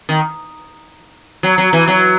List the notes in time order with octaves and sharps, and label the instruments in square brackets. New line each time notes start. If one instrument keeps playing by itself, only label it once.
[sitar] D#3
F#3
F#3
E3
F#3